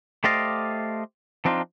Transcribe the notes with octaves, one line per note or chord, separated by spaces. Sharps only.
A3 G4 C5 D5 D#5 F5
F3 C4 D4 D#4 F4